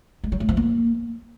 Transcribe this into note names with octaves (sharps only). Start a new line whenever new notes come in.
G#3
F#3
A3
F3
A#3